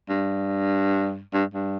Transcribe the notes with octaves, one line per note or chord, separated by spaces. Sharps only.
G2
G2
G2